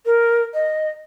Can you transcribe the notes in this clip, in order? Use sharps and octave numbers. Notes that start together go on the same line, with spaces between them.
A#4
D#5